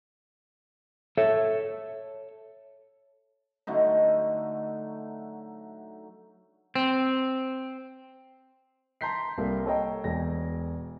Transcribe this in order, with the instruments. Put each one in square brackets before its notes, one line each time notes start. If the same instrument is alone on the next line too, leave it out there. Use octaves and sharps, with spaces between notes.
[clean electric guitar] A4 C#5 E5
[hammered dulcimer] D3 F#3 A3 D#4
[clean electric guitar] C4
[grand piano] A5 A#5 C6 G6 B6 C7
C2 A#3 A4
A4 C#5 D#5 G5 A#5
E1 A#6